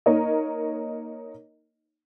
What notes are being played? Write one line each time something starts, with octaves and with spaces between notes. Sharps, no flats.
A#3 D#4 A#4 C#5 D#5